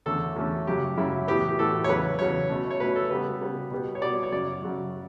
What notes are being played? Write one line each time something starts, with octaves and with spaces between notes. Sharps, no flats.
E2 D3 A3 C#4 A4
E2 D3 A3 C#4
F#2 C#3 F#3 C#4 G4
F#2 C#3 F#3 C#4 E4
A2 E3 B3 G4
G4
A2 E3 B3 A4
C#5
E2 C#3 F#3 B4
E2 C#3 F#3 C#5
B2 A3 C#4
C#5
B2 A3 C#4 B4
A4
C#3 G3 B3 B4
C#3 G3 B3
B2 G3 B3
C#5
B2 G3 B3 D5
C#5
F#2 C#3 F#3 D5
F#2 C#3 F#3